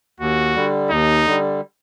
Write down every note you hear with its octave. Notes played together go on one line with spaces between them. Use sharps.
D#2 F#4
D3 G3
D#2 D#4
D3 G3